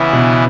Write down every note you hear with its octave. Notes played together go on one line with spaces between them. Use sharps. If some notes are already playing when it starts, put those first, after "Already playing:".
Already playing: C#3 E3 B3 E4
B2